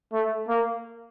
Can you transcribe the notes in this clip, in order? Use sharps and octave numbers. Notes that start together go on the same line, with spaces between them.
A3
A#3